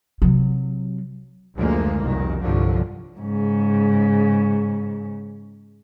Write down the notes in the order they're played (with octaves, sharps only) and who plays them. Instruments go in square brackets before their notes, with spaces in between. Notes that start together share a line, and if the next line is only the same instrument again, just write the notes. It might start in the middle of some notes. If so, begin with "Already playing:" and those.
[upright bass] C3 F#3
[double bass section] F#1 D2 F3 G#3 A#3
F1 C2 F#2 D#3
C2 G2 D3 F3 F#3
[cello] G#2 C#3